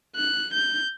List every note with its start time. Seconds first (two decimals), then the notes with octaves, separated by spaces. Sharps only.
0.16 F#6
0.53 G6